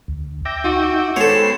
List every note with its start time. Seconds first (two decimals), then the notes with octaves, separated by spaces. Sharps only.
0.08 D2
0.45 E5 G5 D6 A#6
0.64 D#4 F#4
1.16 G#3 B3 A4 C5 C#5 G5 B5